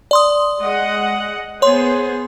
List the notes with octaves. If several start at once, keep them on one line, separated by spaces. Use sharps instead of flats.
D5 C6 D#6
G#3 D#5 F#5
B3 G#4 C5 C#5 C6